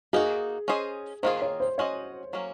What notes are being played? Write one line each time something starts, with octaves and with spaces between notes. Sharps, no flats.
A#3 D#4 F#4 G#4
C#4 G#4 C5 D#5
D#3 A#3 C#4 F4 G#4 C5
C#5
C5
C#4 F#4 C5 C#5 D#5
F#3 A#3 C#4